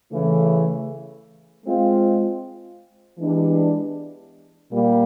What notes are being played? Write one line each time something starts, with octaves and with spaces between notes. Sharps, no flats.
C#3 E3 A3
G#3 C4 F4
E3 G#3 B3 D4 G4
A#2 G3 A#3